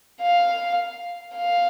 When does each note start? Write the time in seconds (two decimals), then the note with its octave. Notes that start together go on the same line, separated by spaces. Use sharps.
0.22 F5
1.36 F5